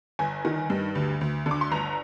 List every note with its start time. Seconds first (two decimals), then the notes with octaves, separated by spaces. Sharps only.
0.19 G1 G#5
0.45 D#3
0.70 G2
0.95 D2
1.21 D2
1.46 D3
1.51 D6
1.61 C6
1.72 G1 A#5